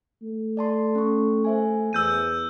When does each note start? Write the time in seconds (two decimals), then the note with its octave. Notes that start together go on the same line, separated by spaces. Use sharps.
0.22 A3
0.57 D5 A5 C6
0.95 C#4 C#6
1.44 C5 E5 G#5
1.93 E2 E6 G6 D#7